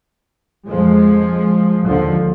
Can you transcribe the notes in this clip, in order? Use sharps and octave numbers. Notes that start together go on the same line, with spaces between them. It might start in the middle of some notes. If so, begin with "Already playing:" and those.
F2 F3 G#3
D#2 D3 F3